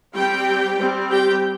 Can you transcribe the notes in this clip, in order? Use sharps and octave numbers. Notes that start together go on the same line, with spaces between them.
G3 C4 G4 G5
G3 C4
G4 G5